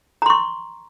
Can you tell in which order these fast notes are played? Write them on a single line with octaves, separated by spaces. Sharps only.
A#5 C6 C#6